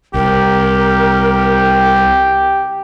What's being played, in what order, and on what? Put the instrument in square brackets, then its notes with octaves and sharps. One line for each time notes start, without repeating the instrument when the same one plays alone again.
[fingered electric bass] C2 [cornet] G4 [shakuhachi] A#4